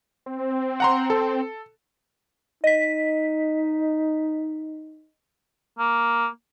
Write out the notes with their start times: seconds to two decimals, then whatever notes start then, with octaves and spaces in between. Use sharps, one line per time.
0.26 C4
0.80 F#5 A#5 C6
1.10 A4
2.64 D#4 D#5 B6
5.79 A#3